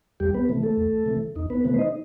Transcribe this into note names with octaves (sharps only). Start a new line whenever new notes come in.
E2 G3 G4
B3 B4
C3 E3 A3
A3 A4
E2
C3 E3 A3
E2 D#4
B3 B4
C3 E3 A3 B3 B4
C5
D#4 D#5